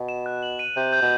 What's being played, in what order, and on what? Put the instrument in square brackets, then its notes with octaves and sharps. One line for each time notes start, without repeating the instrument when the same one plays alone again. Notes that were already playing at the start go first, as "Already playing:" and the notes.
Already playing: [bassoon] B2
[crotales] E7
F#6
F#7
D#7
[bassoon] C3 [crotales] G6
[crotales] G6
[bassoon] B2